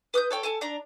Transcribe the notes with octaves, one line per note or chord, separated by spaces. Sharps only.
B4 D#6 F#6 G6
A4 C#5 G5
A4 G#5 A5
D4 D5 A#5